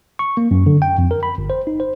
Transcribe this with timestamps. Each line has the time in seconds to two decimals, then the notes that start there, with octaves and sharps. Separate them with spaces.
0.19 C#6
0.37 A#3
0.51 F#2
0.66 D3
0.82 G5
0.98 F2
1.11 A#4
1.23 B5
1.38 G1
1.50 C5
1.67 D#4
1.80 C5